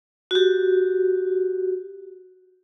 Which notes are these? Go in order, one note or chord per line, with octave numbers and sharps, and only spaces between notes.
F#4 G4